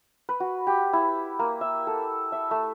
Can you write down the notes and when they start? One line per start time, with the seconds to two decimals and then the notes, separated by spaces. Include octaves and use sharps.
0.29 B4
0.40 F#4
0.67 G4
0.93 E4
1.39 A#3
1.61 E5
1.87 A4
2.32 E5
2.51 A3